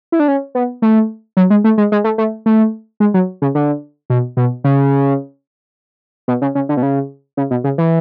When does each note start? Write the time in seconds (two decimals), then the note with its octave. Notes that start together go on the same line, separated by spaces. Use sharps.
0.12 E4
0.20 D4
0.28 C#4
0.55 B3
0.82 A3
1.37 F#3
1.50 G#3
1.64 A3
1.78 G#3
1.92 G#3
2.04 A3
2.18 A3
2.46 A3
3.00 G#3
3.14 F#3
3.42 C#3
3.55 D3
4.10 B2
4.37 B2
4.64 C#3
6.28 B2
6.42 C#3
6.55 C#3
6.69 D3
6.77 B2
6.83 C#3
7.37 C#3
7.51 B2
7.64 C#3
7.78 E3